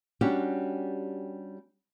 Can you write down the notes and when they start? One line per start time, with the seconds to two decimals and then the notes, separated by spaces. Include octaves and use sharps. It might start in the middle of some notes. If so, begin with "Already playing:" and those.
0.21 G3 C#4 D4 F#4 G4